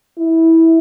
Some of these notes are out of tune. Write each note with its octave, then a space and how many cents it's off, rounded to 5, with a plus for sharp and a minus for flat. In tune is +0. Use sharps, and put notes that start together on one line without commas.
E4 -15